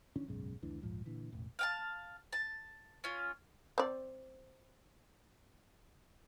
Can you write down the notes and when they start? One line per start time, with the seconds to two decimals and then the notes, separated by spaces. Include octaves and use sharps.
0.16 D#3 E3 C#4 D4
0.28 F#1 B1 G#2 C#3
0.62 F#1 D2 E3 D4
0.82 D#1 A#1 G#2 F3
1.06 A#2 D3 E3
1.32 E1 A1
1.59 F5 G5 A5
2.33 A5
3.04 C#4 F4
3.78 C4 D5